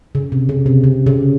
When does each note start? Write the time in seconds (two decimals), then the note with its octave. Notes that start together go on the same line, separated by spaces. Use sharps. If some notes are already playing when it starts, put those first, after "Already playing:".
0.15 C#3
0.32 C3
0.49 C#3
0.66 C3
0.84 C#3
1.06 C#3